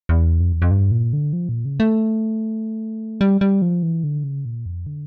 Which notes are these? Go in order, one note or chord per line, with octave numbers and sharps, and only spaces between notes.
E2
F2
E2
F2
G2
A#2
D3
F3
A#2
C#3
A3
G3
G3
F3
E3
D3
C#3
A#2
F2
D3